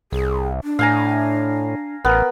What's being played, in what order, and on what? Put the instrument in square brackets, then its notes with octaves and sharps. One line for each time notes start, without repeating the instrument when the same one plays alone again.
[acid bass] C2 [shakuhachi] G#4
[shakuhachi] D4
[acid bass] A2 [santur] F5 G#5 A#5
[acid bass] A1 [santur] B3 A#4